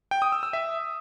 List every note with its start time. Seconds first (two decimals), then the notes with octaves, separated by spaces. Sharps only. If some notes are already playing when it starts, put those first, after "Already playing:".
0.11 G5
0.22 D#6
0.32 E6
0.43 E6
0.53 E5